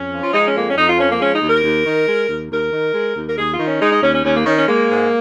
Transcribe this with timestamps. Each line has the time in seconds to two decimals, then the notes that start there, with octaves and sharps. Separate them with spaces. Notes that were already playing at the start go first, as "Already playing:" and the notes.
Already playing: F2 C#4
0.13 F3
0.24 F4
0.34 G#3 D#4
0.45 C#4
0.55 F2 A#3
0.67 C#4
0.77 F2 D#4
0.88 F4
0.98 F3 C#4
1.10 A#3
1.20 G#3 C#4
1.35 D#4
1.42 D#2
1.49 A#4
1.64 D#2
1.85 D#3
2.07 G#3
2.29 D#2
2.50 D#2 A#4
2.73 D#3
2.94 G#3
3.16 D#2
3.27 A#4
3.38 D#2 G#4
3.52 F4
3.59 D#3
3.67 C#4
3.81 G#3 D#4
3.92 D#4
4.03 D#2 C#4
4.13 C#4
4.24 D#2 C#4
4.35 A#3
4.46 D#3 C#4
4.58 C#4
4.67 G#3 A#3
4.89 G#2